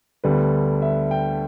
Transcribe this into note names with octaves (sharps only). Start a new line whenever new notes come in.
D2 D3 G3 B3 B4
E5
G5